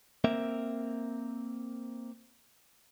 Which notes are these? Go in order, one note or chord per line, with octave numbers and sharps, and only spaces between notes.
A#3 C4 A#4 E5